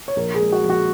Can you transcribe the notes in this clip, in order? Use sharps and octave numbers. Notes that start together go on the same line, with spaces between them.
C#5
A#1 A#4
G#4
G#3
F#4
A#1
F#4